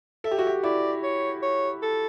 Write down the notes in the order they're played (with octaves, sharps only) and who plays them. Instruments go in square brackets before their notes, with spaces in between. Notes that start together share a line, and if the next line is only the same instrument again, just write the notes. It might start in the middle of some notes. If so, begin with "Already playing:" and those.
[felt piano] A4 [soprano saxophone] E5
[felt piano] G4
F#4
G4
[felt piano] E4 [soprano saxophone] D5
[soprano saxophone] C#5
C#5
A4